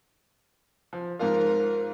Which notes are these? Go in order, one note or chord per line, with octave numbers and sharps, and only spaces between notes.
F3
G#2 F3 F4 A#4